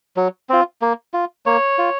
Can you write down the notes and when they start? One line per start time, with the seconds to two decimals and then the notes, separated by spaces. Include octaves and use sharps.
0.17 F#3
0.49 C4 F4
0.82 A#3
1.14 F4
1.46 A#3 C#5
1.78 F4